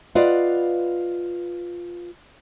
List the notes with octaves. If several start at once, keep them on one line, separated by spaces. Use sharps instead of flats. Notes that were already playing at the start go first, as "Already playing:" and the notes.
F4 B4 D5 D#5 F5 F#5